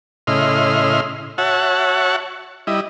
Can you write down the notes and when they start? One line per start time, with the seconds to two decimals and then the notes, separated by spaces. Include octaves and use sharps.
0.27 A2 C#3 E4 D#5 C6 F6
1.38 F#4 C#5 E5 F#5 A5
2.67 G3 E4 D#5